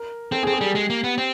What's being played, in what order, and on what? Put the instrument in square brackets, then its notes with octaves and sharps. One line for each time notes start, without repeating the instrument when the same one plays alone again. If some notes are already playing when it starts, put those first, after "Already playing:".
Already playing: [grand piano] A#4
[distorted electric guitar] C4 [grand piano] A4
[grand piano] G#4
[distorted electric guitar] C4
[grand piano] G#4
[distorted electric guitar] G3 [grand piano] G4
[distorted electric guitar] G#3
A#3
B3
C4